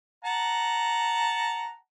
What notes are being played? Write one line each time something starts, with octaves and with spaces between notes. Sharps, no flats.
F#5 A5 A#5